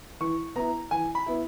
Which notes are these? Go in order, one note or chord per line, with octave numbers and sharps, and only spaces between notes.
E3 C#6
B3 E4 A#5
E3 G#5
B5
B3 E4